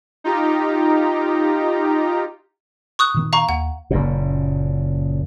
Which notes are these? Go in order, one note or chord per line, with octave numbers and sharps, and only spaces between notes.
D#4 F4 G4 A#5
C#6 D#6 F#6
A#2 D#3 B3
F5 A#5 C#6
D#2 F#5
F#1 F#2 A#2